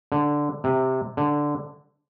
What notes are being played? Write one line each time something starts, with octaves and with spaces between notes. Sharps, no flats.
D3
C3
D3